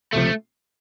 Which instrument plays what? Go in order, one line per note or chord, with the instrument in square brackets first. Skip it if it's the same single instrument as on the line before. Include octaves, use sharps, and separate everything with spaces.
[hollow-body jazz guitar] C#2 C3 F3 [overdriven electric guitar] A3